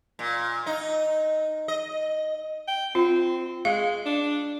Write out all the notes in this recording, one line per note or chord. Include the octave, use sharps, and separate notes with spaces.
A#2
D#4
D#5
G5
C4 F4
G#3 F5
D4